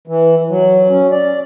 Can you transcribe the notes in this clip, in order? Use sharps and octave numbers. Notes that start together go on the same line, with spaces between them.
E3
F#3
C#4
D5